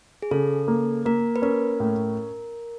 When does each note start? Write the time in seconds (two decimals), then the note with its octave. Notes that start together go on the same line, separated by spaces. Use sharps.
0.22 G#4
0.31 C#3 A4
0.68 A#3
1.05 A#3 A#4
1.36 B4
1.42 C#4 A#4
1.80 A2